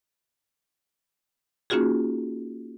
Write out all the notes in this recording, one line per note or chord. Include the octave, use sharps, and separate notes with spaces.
A#3 C#4 D#4 F4 F#4 G#4